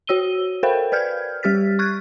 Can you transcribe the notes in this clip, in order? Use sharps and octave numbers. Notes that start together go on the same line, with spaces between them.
F#4 C#5 E6 D#7 G7
A4 A#4 C5 F5 G5 B5
B4 D5 F6 G6 G#6
G3 G4 F6 A6 B6
C#6 F6 F#6 G#6 A6